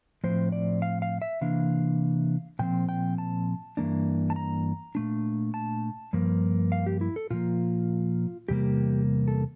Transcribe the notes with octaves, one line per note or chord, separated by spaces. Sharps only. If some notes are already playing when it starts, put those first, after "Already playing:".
A2 F3 C4 C5
D5
F5
F5
E5
C3 E3 A#3 D4 F5
A#2 F3 C4 G5
G5
A5
G2 E3 A#3 D4
A5
A#5
A#2 A3 D4
A5
G2 F3 A#3
F5
G4
E4
A4
A#2 F3 A#3 F4
E2 C3 G3 A#3 G4
A4